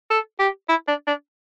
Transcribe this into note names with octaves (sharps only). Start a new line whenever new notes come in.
A4
G4
E4
D4
D4